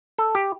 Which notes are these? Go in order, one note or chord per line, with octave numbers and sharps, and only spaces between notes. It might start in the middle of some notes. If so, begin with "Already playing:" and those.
A4
G4